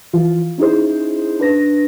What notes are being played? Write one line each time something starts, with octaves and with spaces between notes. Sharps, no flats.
E3 F3 F4
C#4 D#4 E4 G#4 C5
D4 B4 A#6